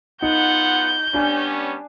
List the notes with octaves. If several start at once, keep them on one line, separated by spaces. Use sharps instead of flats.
B3 D#4 F4 F#5 G6
G3 B3 C#4 D4 G#5